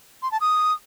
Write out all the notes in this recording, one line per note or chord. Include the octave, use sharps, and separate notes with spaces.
C6
A5
D#6